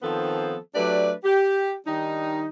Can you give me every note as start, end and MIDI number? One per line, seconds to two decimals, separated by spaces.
0.03 0.56 51
0.03 0.56 53
0.03 0.56 59
0.03 0.56 60
0.03 0.56 69
0.03 0.56 72
0.75 1.12 54
0.75 1.12 57
0.75 1.12 62
0.75 1.12 67
0.75 1.12 71
0.75 1.12 74
1.24 1.75 67
1.86 2.48 51
1.86 2.48 55
1.86 2.48 62
1.86 2.48 63